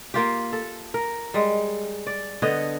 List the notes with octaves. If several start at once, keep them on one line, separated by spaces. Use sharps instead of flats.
A#3 F4 G4
A4
A#4
G3 G#3
D5
D3 B3 C#5 D#5